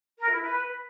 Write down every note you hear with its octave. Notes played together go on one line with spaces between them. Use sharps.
A#4
E4
B4